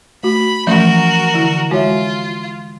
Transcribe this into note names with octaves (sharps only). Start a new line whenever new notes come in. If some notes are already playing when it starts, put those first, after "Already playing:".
A3 F#4 B5
E3 F3 A3 C#4 F#4 A#4
D3 E3 E4
G#3 F4 F#4 C#5 E5